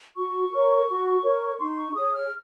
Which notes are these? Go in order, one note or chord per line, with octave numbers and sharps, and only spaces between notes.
F#4 C#6
A#4 C#5
F#4
A#4 C#5
D#4 C6
C#6
G#4 C#5 D#6
F6